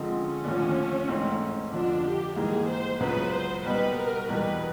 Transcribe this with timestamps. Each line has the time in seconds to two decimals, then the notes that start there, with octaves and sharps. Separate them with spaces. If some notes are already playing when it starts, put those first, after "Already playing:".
Already playing: D3 F3 G#3 C4 D#4
0.11 C#4
0.44 D#2 D3 F3 A3 D4
1.08 G#2 E3 A3 C4
1.72 F2 D3 F3 D4
2.04 G4
2.36 G#2 E3 G3 A#3 G#4
2.69 C5
3.00 C#2 C#3 F#3 B3 B4
3.32 C5
3.64 B2 G3 B3 D#4 B4
3.97 A#4
4.29 E2 B2 G3 B4